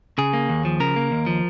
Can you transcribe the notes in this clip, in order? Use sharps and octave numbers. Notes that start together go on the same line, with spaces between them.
C#3 G#4
A#3
D#2
F3
C#3 A#4
A#3
D#2
F3